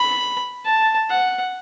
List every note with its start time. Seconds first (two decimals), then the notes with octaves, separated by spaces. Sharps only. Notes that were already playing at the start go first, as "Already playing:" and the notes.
Already playing: B5
0.65 A5
1.10 F#5